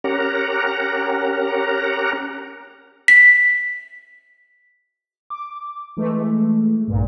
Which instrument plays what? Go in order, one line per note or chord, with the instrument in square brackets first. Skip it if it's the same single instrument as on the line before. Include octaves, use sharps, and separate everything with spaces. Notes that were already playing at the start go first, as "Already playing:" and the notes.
[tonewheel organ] C#4 G4 A#4 F#5 A#5
[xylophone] B6
[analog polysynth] D6
E3 G#3 A3
A#1 G2 A#2